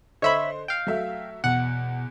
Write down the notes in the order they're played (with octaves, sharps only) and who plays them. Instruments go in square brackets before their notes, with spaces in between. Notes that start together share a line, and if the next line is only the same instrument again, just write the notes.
[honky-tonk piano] D3 C5 [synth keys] C#5 E5 B5 [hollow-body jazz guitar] D#5
[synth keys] F5 G5
[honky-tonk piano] F#3 A3 E5
[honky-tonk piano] E2 [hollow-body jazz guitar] B2 [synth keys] F#5